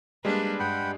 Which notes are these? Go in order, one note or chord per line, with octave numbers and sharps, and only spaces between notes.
G3 G#3 A#3 D4 B4
G2 F#5 G5 B5